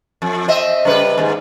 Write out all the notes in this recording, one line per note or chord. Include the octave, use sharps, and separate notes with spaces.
F2
C4 D#5 E5
C#3 G3 B4
D#2 G#2